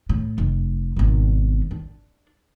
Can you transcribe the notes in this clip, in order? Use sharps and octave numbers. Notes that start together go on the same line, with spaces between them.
A2
F1
G#1 B2
D4